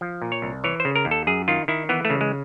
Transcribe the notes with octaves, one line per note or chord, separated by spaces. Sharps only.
F3
A#2
C#5
C2
E3 C#5
C5
C#3
A#4
D#2
A4
F#2 G#4
D#3 F4
D#3 E4
E3 B3
A3
C#3
G#3